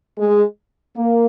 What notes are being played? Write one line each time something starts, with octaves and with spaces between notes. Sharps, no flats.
G#3
A#3